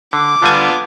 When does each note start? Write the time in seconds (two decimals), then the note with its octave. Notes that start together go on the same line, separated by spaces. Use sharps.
0.13 D3 D6
0.42 D3 G3 B3 D4 F4 G#5